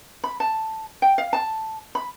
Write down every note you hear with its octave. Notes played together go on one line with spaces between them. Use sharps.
B5
A5
G5
F5
A5
B5